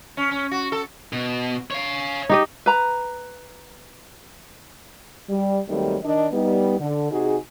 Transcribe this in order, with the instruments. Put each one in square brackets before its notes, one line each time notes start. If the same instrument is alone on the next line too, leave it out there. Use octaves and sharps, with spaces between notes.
[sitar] C#4
C#4
F#4
A4
[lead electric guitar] B2
C#5 F5
[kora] D#4 G4 D#5
[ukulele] B4 A#5
[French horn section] G3
D#2 D#3 F#3 G3 A3 C4
D#3 D4 D#5
G3 B3 D#4
D3
C3 D#4 F#4 G#4